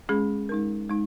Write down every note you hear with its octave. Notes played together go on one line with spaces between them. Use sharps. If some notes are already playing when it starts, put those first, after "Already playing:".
G#3 C#4 G#4
G#3 D#4 A#4
G#3 D#4